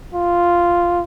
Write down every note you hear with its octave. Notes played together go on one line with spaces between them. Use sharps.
F4